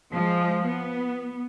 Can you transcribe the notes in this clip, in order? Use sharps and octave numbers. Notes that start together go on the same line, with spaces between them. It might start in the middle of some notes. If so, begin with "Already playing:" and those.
F3 G#3
B3